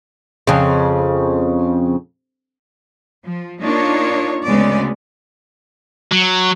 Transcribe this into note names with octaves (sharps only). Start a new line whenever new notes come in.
F2 C#3
F3
A#3 D4 D#4 F4 C#5
D2 C#3 G#3 B3 D5
F#3